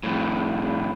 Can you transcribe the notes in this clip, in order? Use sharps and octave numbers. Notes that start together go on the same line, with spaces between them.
F2 A2